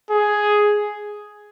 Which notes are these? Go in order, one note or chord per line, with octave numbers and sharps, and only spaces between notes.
G#4